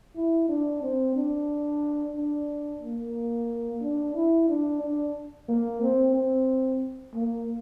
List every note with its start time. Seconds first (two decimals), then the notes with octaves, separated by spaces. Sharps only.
0.16 E4
0.49 D4
0.82 C4
1.16 D4
2.16 D4
2.82 A#3
3.82 D4
4.15 E4
4.49 D4
4.81 D4
5.49 A#3
5.82 C4
6.15 C4
7.15 A#3